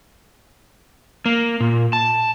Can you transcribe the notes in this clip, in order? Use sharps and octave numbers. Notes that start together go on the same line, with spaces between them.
A#3
A#2
A5